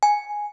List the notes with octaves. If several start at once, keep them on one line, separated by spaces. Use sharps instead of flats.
G#5